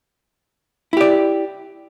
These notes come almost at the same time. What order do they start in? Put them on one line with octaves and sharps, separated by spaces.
E4 G4 D5